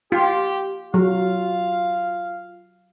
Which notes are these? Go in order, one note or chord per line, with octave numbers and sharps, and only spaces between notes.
F4 G4
F#3 F4 F5